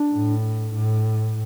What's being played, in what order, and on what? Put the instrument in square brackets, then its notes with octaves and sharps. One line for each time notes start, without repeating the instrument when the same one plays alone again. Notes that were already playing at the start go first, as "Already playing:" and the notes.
Already playing: [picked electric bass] D4
[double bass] A2
A2